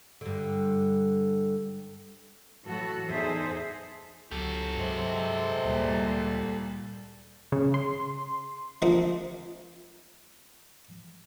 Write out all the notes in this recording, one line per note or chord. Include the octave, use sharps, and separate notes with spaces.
G2 D3
A2 E3 F#3 F#4 A4
E2 D#4 G#4 A4 C5 E5
C#2 F#3 G4 A4
G2 C3 G#3 C4
D2 A#2 G3
C#3
C6
D2 F3 A#3 C4 F4 D#5